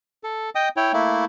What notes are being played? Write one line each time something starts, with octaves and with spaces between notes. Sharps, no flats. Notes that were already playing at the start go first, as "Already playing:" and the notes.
A4
D#5 G5 D#6
E4 C#5 G5
A3 A#3 E4